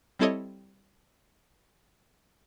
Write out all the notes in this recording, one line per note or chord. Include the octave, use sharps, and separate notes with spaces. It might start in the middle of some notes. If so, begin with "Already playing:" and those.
G3 C4 E4 A4 C#5 D#5